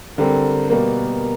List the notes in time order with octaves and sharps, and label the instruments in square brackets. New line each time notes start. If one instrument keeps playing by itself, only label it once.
[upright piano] D3 G3 C4 [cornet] A#4
[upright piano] B2 G3 A#3 [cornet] A#4